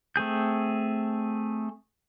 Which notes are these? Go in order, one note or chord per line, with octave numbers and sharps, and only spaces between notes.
A3 C4 G#4 G6